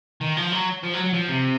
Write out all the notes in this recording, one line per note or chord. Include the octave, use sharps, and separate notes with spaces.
D#3
F3
F#3
F3
F#3
F#3
F3
C3